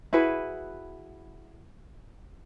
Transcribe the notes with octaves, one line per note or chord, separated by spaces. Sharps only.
E4 F#4 G#4 B4